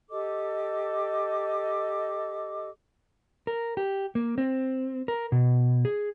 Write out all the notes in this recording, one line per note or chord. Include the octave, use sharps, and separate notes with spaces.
G4 A4 D#5 D6
A#4
G4
A#3
C4
A#4
B2
G#4